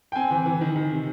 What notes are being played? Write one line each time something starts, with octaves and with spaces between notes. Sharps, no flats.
G5
C4 G#5
E3
E3
D#3
D#3
C3